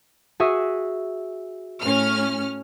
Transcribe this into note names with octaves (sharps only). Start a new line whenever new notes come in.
F#4 G#4 E5
A2 C#4 F6